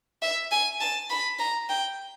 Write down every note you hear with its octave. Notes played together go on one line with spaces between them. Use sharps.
E5
G#5
A5
B5
A#5
G5